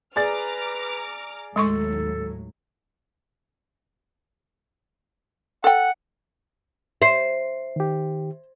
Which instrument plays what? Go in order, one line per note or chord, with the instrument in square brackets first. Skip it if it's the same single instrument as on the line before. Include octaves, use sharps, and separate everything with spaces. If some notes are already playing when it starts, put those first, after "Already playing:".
[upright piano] G#4 D5 A6 [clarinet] B4 [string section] A#5 D6 F6
[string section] D#2 A2 F#3 [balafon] G#3 C6 C#6 [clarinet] A4
[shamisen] A4 G5 [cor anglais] F#5
[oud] C5 [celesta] E5 C7
[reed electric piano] D#3 G4